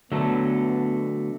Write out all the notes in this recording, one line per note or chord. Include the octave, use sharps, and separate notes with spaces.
D3 F#3 A3 B3